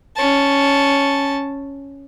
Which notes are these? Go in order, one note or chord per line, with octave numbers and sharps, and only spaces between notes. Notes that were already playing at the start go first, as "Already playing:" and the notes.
C#4 A5